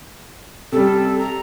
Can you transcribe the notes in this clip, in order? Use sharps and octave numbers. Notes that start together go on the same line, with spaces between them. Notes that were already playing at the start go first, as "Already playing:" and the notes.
C3 G3 A4
A#5